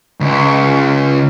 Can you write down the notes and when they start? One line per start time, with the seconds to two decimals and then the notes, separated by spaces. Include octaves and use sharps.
0.20 C#2